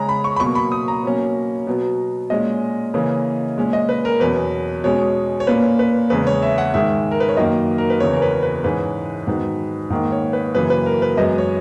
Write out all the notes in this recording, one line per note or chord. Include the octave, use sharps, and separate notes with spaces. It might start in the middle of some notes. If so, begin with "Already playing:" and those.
Already playing: C#3 G#3 C#4 A#5
B5
C#6
B5
B2 F#3 A#3 C#6
B5
D#6
A#5
B2 F#3 A#3 C#4
B2 F#3 B3
A#2 G#3 C#4 D#5
C#3 E3 A#3 C#4
A#2 G#3 C#4
D#5
B4
A#4
E2 B2 F#3 C#4 B4
B2 G#3 C#4 C#5
C#5
A#2 A#3 C#4 B4
B4
E2 C#3 G#3 B4
C#5
E5
F#5
G#2 D#3 G#3 E5
A#4
B4
C#5
F#2 D#3 A#3 D#5
A#4
B4
E2 C#3 E3 B3 C#5
A#4
B4
B4
G#2 E3 G#3 C#4 B4
G#2 D#3 F#3 B3
G#2 D#3 A#3
C#5
B4
F#2 C#3 E3 A#3 B4
B4
A#4
B4
F#2 E3 G#3 B3 D#5
C#5